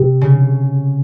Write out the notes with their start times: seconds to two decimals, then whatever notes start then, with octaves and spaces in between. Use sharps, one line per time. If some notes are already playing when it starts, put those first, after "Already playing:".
Already playing: C3
0.21 C#3